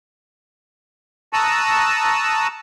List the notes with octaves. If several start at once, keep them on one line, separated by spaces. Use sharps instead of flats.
A5 A#5 C#6 D#6 E6 F#6